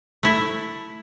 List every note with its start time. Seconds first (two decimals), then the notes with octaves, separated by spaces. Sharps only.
0.23 A3 E4